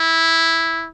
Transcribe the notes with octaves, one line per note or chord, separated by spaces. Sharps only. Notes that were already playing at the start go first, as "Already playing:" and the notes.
Already playing: E4